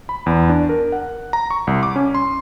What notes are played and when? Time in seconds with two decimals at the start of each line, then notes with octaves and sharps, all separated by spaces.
0.09 B5
0.26 E2
0.50 D4
0.69 A#4
0.92 F#5
1.33 A#5
1.50 C#6
1.67 C2
1.83 D6
1.96 C#4
2.15 C6